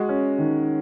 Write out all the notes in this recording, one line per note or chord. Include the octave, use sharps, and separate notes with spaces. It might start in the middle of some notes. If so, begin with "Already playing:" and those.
Already playing: G#3 F#4
C#4
D#3